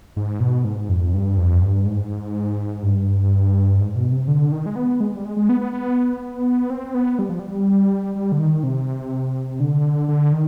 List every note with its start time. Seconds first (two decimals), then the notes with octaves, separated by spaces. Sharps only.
0.16 G#2
0.40 B2
0.65 G#2
0.89 F2
1.14 G2
1.37 F2
1.61 G2
1.86 G#2
2.83 G2
3.80 G#2
3.95 B2
4.12 C3
4.28 D3
4.52 D#3
4.66 G#3
4.76 B3
5.00 G#3
5.14 G3
5.25 G#3
5.37 G#3
5.49 B3
5.61 B3
5.73 B3
6.70 C4
6.94 B3
7.19 G3
7.29 F3
7.39 G3
8.16 G3
8.32 D3
8.39 D#3
8.63 C3
9.60 D3
10.08 D3
10.33 D#3